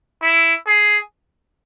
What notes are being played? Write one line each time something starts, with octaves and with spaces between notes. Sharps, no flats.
E4
G#4